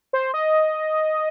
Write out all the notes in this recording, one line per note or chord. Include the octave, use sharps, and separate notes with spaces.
C5
D#5